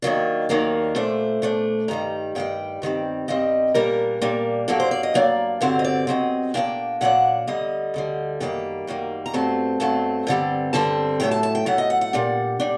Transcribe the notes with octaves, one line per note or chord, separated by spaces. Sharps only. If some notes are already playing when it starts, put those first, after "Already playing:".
D#2 D#3 F#3 A#3 D4
D#2 D#3 F#3 A#3 D4
A#2 A3 D4 C5
A#2 A3 D4
G2 D#3 G3 A#5
G2 D#3 G3 G5
G2 D#3 G3 C4
G2 D#3 G3 C4 D#5
A#2 G3 A#3 D4 A#4
A#2 G3 A#3 D4
G2 F#3 A#3 D4 A4
C5
D5
D#5
G2 F#3 A#3 D4 D5
G2 D3 F#3 C4 C5
D#5
D5
G2 D3 F#3 C4 D#5
A#2 F#3 A#3 D4 G5
A#2 F#3 A#3 D4 F#5
D2 D3 G3 D#5
D2 D3 G3
F#2 D#3 G3 A#3 G5
F#2 D#3 G3 A#3
A#5
G2 F#3 A3 C4 A5
G2 F#3 A3 C4 A5
G2 D3 G3 C4
G2 D3 G3 C4 A5
A2 F#3 A3 G5
A5
A5
G5
A2 F#3 A3 F#5
D#5
F#5
F#5
A#2 G3 D4
A#2 G3 D4